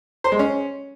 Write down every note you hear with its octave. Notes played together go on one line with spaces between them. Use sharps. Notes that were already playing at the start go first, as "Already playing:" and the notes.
C5
G#3
C#4